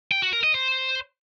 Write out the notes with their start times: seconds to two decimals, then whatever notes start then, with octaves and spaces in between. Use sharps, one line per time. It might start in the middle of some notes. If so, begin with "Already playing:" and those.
0.12 G5
0.22 F#4
0.33 A#4
0.44 D#5
0.54 C5